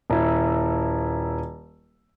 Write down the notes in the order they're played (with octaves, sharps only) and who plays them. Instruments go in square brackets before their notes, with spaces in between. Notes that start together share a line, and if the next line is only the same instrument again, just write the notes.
[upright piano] D#1 E4